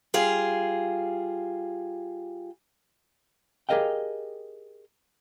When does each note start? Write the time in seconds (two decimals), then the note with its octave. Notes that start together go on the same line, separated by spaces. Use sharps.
0.14 G3 F4 G#4 F5
3.69 G4 G#4 A#4 D#5 F5 G5